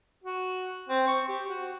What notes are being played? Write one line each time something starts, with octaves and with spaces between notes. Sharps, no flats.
F#4
C4
C#6
G4
F#4